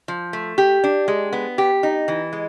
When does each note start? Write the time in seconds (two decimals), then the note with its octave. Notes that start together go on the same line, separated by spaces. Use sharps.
0.08 F3
0.33 A3
0.58 G4
0.84 D4
1.08 G#3
1.33 B3
1.58 G4
1.83 D#4
2.08 E3
2.33 G#3